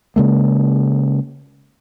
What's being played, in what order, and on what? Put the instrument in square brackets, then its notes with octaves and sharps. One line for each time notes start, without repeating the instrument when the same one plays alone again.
[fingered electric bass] C#3 G#3 A#3